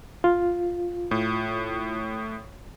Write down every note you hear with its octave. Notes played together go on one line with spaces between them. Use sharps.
F4
A2